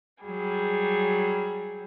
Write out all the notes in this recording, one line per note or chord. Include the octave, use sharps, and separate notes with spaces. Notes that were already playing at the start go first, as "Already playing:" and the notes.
F#3 G3 G#4